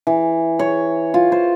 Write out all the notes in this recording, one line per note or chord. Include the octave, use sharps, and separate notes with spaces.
E3
C#5
F4
C5